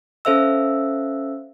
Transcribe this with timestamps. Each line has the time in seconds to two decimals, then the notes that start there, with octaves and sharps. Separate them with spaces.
0.25 C#4 A4 C5 E5 F5 E6